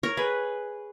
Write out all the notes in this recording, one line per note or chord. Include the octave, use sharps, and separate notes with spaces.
A#4 C#5
G#4 B4